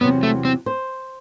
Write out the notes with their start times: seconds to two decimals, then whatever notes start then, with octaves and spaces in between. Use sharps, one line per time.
0.01 E2 C3 F#3 B3
0.23 A3
0.45 C4
0.66 C5